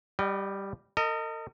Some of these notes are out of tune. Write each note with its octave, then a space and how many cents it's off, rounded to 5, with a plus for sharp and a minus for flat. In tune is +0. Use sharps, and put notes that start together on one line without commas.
G3 +0 D#5 -25 G5 -40
A#4 -45 D#5 +0